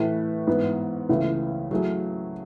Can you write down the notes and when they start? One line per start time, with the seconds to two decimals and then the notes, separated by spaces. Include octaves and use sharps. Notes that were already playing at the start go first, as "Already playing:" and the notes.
Already playing: A2 E3 A3 E4 B4
0.47 G#2 E3 B3
1.09 C#2 C#3 E3 A3 E4
1.71 F#3 A3 E4 G#4